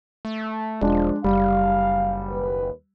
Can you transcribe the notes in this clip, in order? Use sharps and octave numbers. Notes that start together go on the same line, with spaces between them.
A3
E1 F3 G#3 D4
F#1 G3 F5
D#2 B4